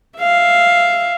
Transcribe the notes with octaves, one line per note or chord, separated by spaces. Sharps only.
E5 F5